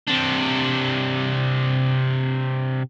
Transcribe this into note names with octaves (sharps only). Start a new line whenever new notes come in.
C3 D4